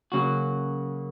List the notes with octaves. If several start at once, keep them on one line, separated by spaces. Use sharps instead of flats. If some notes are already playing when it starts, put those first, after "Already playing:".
C#3 F#3 A#3 C#4 F#4